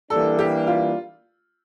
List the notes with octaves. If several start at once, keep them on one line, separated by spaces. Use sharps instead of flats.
E3 G3 A#3 D4 A4
G4
F4